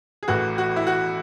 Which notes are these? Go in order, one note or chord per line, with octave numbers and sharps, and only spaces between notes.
G#4
A1 A2 E3 F#4
F#4
E4
F#4